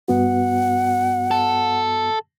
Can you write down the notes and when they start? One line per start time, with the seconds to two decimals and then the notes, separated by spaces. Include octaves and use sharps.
0.08 G2 B3 F#4 F#5
1.31 A4